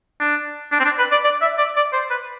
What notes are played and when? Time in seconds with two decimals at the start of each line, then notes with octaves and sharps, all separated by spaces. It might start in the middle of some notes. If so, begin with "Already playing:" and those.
0.20 D4
0.72 D4
0.80 C4
0.85 D4
0.98 B4
1.11 D5
1.24 D5
1.42 E5
1.58 D5
1.76 D5
1.93 C5
2.10 B4